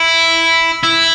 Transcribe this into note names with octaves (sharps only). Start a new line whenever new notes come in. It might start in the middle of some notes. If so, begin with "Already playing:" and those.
Already playing: E4
E4